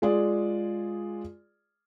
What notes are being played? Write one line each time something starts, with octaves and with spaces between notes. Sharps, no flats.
G#3 F4 G#4 D5